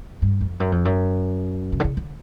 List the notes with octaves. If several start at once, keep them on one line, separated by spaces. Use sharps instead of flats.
G2
F2
F#2
F2
F#2
C3
D3
C#3
D3